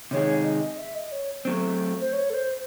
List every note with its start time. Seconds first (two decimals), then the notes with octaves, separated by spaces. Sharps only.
0.11 C3 D#3 G#3 D#4 G#4 C#5
0.45 D#5
0.78 E5
0.95 D#5
1.12 C#5
1.45 F#3 A3 C4
2.01 C5
2.13 C#5
2.30 A4
2.34 C5